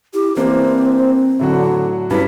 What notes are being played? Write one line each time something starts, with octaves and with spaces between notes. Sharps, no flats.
E4 G4
E3 A#3 C4 D4 C5
A2 D3 F#3 F#4
G2 C#4 E4 B4 B6